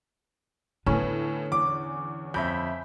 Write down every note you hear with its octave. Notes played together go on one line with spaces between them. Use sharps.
A2 D3 B3 C#4
E2 D6
F2 E5 B5 G6